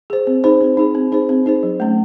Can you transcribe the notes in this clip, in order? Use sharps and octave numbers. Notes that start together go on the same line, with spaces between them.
G#4 C5
C4
D#4 G#4 C5
C4
D#4 G#4 C5
C4
D#4 G#4 C5
C4
D#4 G#4 C5
F#3
A3 C#4